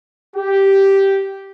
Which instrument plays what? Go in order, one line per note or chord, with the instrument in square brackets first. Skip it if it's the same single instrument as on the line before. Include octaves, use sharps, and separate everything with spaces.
[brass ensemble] G4